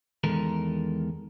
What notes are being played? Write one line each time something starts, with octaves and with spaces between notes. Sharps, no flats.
E2 D#3 G#3 A4 A#4